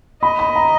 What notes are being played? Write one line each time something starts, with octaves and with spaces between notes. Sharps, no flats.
D#5 B5
B5
A#5